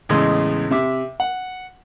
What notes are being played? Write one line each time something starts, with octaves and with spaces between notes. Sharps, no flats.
E2 A2 C#3 G#3 D#5 C6
C3 E5 D6
F#5